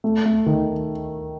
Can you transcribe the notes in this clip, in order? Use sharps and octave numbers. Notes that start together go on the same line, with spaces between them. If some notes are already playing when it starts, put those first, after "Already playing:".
A3
A3
D#3